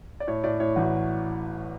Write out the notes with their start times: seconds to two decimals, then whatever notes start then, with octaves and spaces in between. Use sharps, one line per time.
0.20 D5
0.27 A2 C#5
0.44 A2 D5
0.60 A2 C#5
0.76 A1 F#4